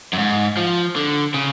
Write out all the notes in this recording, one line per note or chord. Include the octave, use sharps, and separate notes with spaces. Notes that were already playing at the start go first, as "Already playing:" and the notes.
F#2
G#2
F3
D3
C#3